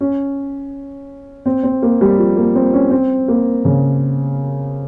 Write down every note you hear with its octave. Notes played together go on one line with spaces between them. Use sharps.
C#4
C4
C4
A#3
G3
F3
A#3
C4
C#4
C4
A#3
C#3